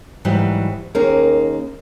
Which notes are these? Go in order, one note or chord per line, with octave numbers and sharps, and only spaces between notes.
G#2 E3 F#3 G3
D#2 A#3 C#4 D#4 G#4 A#4